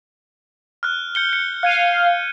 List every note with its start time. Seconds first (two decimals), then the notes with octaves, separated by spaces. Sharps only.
0.83 F6 F#6
1.15 G6 C#7 G7
1.33 C#7
1.63 F5 F#6 G#6 D#7